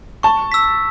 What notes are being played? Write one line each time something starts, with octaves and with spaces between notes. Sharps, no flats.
A5 C#6
E6 B6